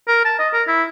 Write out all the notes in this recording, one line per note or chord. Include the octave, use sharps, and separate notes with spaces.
A#4
A5
D#5
A#4
E4